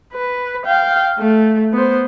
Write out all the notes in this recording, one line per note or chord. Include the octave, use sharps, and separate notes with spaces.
B4
F5 G5
A3
B3 C5